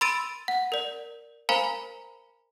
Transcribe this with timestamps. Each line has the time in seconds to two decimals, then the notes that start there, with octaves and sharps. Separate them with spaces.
0.01 B5 C6 E6 A6 D7 D#7
0.48 F#5
0.72 A#4 D5
1.49 A#4 C5 F5 G#5 A#5 B5